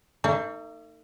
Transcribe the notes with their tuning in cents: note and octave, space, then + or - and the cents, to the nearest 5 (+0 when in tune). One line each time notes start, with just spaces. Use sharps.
A3 +45 D#4 +0